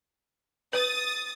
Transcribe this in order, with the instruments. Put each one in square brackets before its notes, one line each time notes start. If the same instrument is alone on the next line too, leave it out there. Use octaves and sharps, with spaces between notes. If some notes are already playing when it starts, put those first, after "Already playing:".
[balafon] B4 [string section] D#6 A6